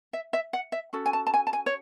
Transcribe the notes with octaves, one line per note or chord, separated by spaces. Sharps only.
E5
E5
F#5
E5
C#4 F#4 A4
G#5
A5
A5
G#5
A5
G#5
C#5